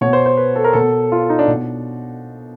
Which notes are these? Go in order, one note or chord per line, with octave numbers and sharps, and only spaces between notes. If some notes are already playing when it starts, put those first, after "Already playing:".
B2 C#5
C5
C5
B4
A4
A#4
B2 A4
F4
D#4
D4
B2